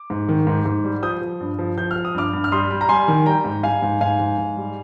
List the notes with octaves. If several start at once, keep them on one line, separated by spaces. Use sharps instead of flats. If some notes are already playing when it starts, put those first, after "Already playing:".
Already playing: D6
G#2
D#3
G#2
G#2
G3
F3 D#6 G6
F3
G2
F3
F3 G6
F6
F3
D#6
G2 D6 F6
G2
F6
G3 C6 D#6
G3
A#5
G3 G#5 C6
D#3
G3 G5 A#5
G#2
G3 F5 G#5
G#2
G#2 F5 G#5
G#2
G#2
G3